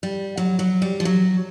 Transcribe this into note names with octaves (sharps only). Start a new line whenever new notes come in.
G3
F#3
F#3
G3
F3
F#3